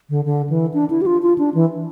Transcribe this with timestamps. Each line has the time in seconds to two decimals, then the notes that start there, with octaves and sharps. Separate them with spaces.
0.10 D3
0.25 D3
0.50 E3
0.74 D4
0.90 E4
1.02 G4
1.06 F4
1.22 F4
1.38 D4
1.54 E3